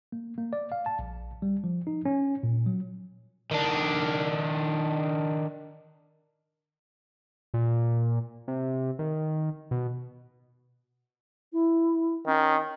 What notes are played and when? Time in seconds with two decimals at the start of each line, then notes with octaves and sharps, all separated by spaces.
0.12 A#3
0.38 A#3
0.53 D5
0.72 F5
0.86 A5
0.99 A#1
1.42 G3
1.64 F3
1.87 D#4
2.05 C#4
2.43 A#2
2.66 F#3
3.51 D#3 D4
7.54 A#2
8.48 C3
8.99 D#3
9.71 B2
11.53 E4
12.27 D#3 C#4